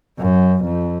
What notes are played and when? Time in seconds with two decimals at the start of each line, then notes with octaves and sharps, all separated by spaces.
0.19 F#2
0.65 F2